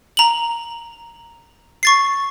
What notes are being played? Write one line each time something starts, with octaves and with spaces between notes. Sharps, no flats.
A#5 F#7
C#6 A6 C7